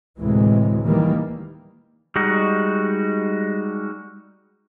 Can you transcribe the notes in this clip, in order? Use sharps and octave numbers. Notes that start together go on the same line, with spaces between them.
D2 A2 C3 E3 G#3
D#3 E3 G3 A#3
G3 G#3 D#4 F#4